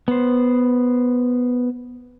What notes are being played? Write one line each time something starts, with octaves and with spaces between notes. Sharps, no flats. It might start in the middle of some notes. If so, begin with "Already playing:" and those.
B3 C5